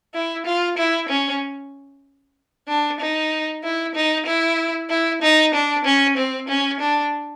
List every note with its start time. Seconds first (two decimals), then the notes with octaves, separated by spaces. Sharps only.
0.14 E4
0.46 F4
0.77 E4
1.09 C#4
2.68 D4
3.00 D#4
3.64 E4
3.95 D#4
4.26 E4
4.90 E4
5.23 D#4
5.54 D4
5.85 C#4
6.17 C4
6.49 C#4
6.80 D4